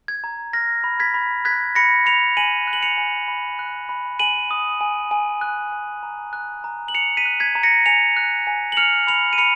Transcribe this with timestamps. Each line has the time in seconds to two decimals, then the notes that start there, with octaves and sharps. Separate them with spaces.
0.08 G#6
0.24 A#5
0.53 F6 A#6
0.84 B5
1.00 G#6 B6
1.14 B5
1.45 F#6 G#6 B6
1.75 B5 A#6 C#7
2.06 B5 C#7 F7
2.37 G#5 D#7 F#7
2.67 F#6
2.73 F#7
2.83 C#7 F7
2.98 G#5
3.28 B5
3.59 F#6
3.89 B5
4.19 G#5 D#7 F#7
4.51 D#6
4.81 G#5
5.11 G#5
5.41 F#6
5.72 G#5
6.03 A#5
6.33 F#6
6.64 A#5
6.88 F#7
6.94 A#5 C#7 F7
7.17 B6 D#7
7.25 F#6
7.40 G#6 B6
7.55 A#5
7.63 A#6 C#7
7.86 G#5 C#7 F7
8.17 F#6
8.47 G#5
8.72 F#7
8.77 F6 C#7 F7
9.07 B5 C#7 F7
9.33 D#7
9.38 B5 C#7 F7